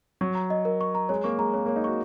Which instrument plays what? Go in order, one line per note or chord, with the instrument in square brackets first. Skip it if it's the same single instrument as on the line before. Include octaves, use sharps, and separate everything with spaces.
[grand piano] F#3 [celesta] C#6
[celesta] A#5
D#5
A#4
C#6
A#5
[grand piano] G#3 [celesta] C#5
[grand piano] A#3 [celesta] C#6
[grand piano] G#3 [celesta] A#5
[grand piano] A#3 [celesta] C#5
[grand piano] A#3 [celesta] C#5
[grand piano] D#4
[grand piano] F#4 [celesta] C#6